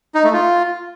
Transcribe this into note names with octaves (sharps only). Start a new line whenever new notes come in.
D#4
A3
F4